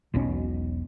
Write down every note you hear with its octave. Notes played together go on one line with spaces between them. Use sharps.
E1 B1 B2 C#4